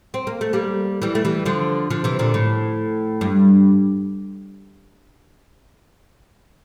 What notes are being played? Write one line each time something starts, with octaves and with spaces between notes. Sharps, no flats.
C4
A#3
A3
G3 A#3
E3 G3
A3
E3 G3
D3 F3
D3 F3
C3 E3
A#2 D3
A2
G2